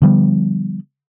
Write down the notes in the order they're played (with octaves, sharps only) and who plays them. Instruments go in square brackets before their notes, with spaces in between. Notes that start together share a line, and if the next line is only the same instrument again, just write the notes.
[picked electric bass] D3 F3 G3 B3